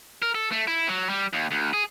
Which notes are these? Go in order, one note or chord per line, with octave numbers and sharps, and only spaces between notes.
A#4
A4
A3
E4
F#3
G3
D#2
D2
G#4